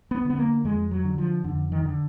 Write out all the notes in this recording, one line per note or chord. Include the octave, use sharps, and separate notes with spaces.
B3
D3
B3
A#3
F2 G#3
F#3
D3
F3
F2 D3
D#3
D3